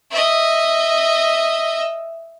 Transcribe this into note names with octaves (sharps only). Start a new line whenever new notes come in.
D#5 E5